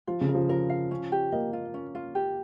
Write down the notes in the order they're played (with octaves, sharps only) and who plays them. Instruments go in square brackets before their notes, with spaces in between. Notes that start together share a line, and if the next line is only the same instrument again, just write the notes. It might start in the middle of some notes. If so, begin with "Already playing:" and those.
[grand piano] F3 [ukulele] F4
[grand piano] C#3
[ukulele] A#4
[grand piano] F3
[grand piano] F3 [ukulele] A#4
[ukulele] F5
C#4
G4
[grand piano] A#3 [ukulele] D#5
[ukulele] F4
C#4
F4
G4